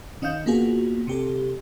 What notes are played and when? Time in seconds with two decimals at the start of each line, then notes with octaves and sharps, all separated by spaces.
0.22 D#3 C#4 D#5 F5 G6
0.46 A#3 B3 F4 F#4 G#4
1.07 C3 G4 A4